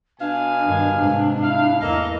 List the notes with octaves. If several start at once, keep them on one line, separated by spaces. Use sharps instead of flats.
B2 D4 F5 G#5
G2 D#3
G#2 C3
E4 F5
E2 E3 A#3 A4 D#5 F5